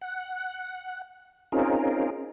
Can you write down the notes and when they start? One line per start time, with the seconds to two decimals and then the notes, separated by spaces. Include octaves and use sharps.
0.01 F#5
1.52 C4 C#4 D#4 F4 G#4 A#4